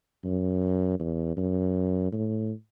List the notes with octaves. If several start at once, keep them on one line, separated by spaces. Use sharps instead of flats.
F#2
E2
F#2
A2